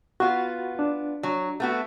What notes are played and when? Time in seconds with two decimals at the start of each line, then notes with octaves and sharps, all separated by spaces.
0.20 B3 F4 F#4
0.79 D4
1.23 F#3
1.60 A3 B3 F#4